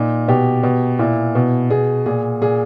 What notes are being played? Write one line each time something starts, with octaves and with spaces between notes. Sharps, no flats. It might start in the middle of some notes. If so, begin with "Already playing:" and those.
Already playing: A#2 D#4
B2 G4
B2
A#2 E4
B2
B2 G#4
A#2 G#4
A#2 G#4